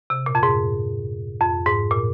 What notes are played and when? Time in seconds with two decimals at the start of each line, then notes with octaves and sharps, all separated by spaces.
0.10 C3
0.26 A#2
0.35 F2
0.43 G#2
1.41 F2
1.66 G#2
1.91 A#2